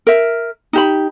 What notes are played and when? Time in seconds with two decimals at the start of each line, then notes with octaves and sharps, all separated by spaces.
0.07 A#4 E5
0.73 D#4 G4 B5